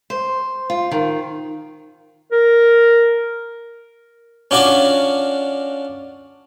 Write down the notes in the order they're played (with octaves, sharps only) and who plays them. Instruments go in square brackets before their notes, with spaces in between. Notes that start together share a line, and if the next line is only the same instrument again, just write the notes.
[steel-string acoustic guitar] C5
F4
D#3
[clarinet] A#4
[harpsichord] C#4 D4 F4 F#4 D5